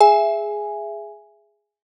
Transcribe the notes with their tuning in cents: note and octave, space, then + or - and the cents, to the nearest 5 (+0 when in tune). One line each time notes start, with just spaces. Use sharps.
G#4 +0 E5 +15 G#5 +0